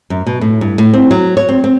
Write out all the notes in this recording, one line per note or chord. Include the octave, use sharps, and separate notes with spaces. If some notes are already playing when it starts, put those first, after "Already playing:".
F#2
B2
A2
G2
A2
C4
F#3
C#5
C4
C4